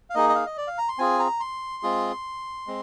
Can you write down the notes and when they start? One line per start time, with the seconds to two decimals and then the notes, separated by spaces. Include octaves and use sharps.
0.10 F5
0.15 A#3 D#4 G#4 D#5
0.29 D#5
0.35 F5
0.46 D#5
0.57 D5
0.67 F5
0.78 A#5
0.88 C6
0.98 C4 F4 G#4 G#5
1.19 A#5
1.40 C6
1.83 G#3 C4 F4 G#4
2.67 G#3 C4